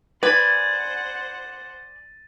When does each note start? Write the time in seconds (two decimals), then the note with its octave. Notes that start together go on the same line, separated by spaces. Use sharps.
0.23 B4 C5 D5 F#5 G#5 A6 D#7